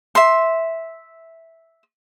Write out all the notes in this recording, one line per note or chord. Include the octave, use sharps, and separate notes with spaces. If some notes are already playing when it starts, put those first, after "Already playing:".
E5 C6